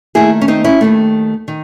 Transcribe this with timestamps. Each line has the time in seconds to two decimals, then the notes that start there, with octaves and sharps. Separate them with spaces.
0.15 D#2 D#3 A3 E4 G#4
0.41 C#4
0.48 C4 D#4
0.64 C#4 E4
0.81 D#2 D#3 A3
1.48 D#3